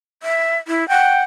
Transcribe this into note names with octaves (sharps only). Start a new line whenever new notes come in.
E5
E4
F#5 G5